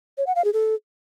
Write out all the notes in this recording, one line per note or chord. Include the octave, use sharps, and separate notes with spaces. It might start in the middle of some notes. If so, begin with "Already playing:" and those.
C#5
F#5
F5
G#4
A4